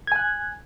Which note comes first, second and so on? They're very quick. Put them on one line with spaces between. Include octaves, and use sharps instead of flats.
G#6 G#5 F#6